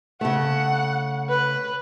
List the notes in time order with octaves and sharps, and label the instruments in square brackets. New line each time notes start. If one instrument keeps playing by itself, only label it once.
[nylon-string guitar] C#3 A3 [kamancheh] F#5
[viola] B4